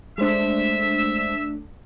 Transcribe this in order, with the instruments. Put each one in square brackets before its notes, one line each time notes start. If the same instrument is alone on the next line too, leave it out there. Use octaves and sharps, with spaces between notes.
[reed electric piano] G#3 C5 [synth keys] A3 D4 [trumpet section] E5